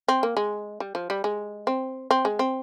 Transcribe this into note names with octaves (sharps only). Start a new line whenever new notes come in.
C4
A#3
G#3
G3
F3
G3
G#3
C4
C4
G#3
C4